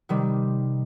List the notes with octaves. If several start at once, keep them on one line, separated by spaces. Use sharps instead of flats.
C3 D#3 G3